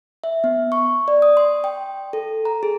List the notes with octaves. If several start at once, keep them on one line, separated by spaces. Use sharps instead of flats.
E5
B3
C#6
D5
D#6
C6
G5
A4
A#5
G#4